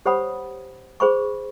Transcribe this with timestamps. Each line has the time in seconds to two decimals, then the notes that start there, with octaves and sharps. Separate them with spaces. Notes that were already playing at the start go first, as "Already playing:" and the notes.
0.05 G4 C5 C#5 F#5 B5 D#6
1.00 G#4 C5 B5 C#6